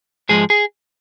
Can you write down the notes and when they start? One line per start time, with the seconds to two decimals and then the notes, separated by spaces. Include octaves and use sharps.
0.29 G#2 F3 G#3 G#4
0.50 G#4